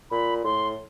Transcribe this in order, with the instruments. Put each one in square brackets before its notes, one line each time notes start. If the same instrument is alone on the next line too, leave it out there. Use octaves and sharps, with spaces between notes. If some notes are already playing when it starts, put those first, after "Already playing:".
[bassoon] A#2 [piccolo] B5
[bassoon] A2 [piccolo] C6